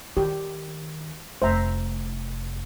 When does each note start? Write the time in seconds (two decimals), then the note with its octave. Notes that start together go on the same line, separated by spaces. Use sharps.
0.17 D#3 G4
1.42 F1 C5 E5 A#5